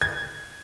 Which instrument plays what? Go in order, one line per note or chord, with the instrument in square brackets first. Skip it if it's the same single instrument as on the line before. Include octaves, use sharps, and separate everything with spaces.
[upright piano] G#6